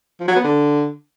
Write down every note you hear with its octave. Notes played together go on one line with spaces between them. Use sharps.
F3
F#3
B3
D3